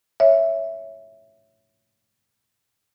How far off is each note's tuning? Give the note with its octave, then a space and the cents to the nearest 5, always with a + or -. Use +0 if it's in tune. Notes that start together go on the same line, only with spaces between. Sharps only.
C#5 +0 E5 +0